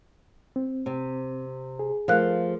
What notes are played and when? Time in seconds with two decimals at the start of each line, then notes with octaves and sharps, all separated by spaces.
0.56 C4
0.86 C3
1.79 G#4
2.08 F3 A3 A#4 F5 F#6